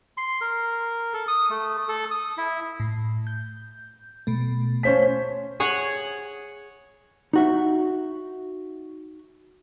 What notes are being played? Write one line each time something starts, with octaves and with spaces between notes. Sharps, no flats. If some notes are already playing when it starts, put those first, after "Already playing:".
C6
A#4
A4
D#6
A3
A4
D#6
E4
A2
G6
B2 A3
C#4 C5 F5 A5 B6
G#4 C#5 F#5
D#4 F#4 E5